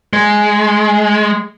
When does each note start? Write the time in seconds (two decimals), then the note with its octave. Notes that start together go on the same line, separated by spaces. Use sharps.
0.13 G#3